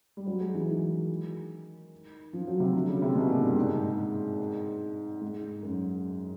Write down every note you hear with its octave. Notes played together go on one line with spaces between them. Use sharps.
G3
F#3
G#3
E3
D#3
F3
F#3
C3
D3
C#3
C3
B2
A#2
G#2
G2
G#2
G#2
F#2